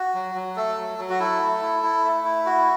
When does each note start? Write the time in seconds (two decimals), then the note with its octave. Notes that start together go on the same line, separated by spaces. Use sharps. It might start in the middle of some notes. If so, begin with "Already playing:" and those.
Already playing: F#4
0.14 F#3
0.35 F#3
0.56 A3 A4
0.78 F#3
0.99 F#3
1.10 F#4
1.20 E4 A4
1.40 A3
1.61 E4
1.83 E4
2.04 A3
2.24 E4
2.46 F#4